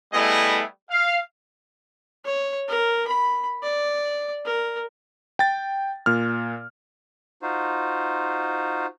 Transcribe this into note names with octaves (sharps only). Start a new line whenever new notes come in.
G3 A3 B3 E4 G#4 D#5
F5
C#5
A#4
B5
D5
A#4
G5 A6
A#2 F6
D#4 F4 F#4 C5